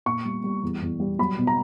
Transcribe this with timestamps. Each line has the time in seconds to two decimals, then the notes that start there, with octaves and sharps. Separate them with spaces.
0.06 A#2 C#6
0.25 G3
0.44 G3
0.63 E2
0.82 E2
1.00 G3
1.19 F#3 B5
1.38 B2
1.47 A#5